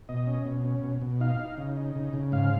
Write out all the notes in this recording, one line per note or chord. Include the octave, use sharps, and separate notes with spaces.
B2 D#5
C#4
B2
C#4
B2
B2
D#4 F5
D#4
C#3
D#4
C#3
C#3
G#2 F5